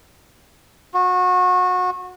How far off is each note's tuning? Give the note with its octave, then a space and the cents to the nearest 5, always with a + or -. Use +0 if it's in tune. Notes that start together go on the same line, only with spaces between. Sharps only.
F#4 -25